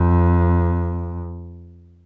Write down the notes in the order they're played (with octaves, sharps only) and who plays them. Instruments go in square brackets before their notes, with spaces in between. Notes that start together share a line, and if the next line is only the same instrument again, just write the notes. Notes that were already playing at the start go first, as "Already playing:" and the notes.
Already playing: [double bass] F2